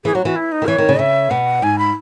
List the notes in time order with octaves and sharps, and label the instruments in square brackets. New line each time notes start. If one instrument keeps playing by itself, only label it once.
[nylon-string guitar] E3 [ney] G#4
[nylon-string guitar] F#3 [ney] F#4
[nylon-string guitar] E3 [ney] F#4
[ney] E4
D#4
[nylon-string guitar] D#3
[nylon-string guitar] E3 [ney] C#5
[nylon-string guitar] D#3
C#3
[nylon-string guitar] C#3 [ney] E5
[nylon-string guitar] B2 [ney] F#5
[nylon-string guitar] G#2 [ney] G#5
[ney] B5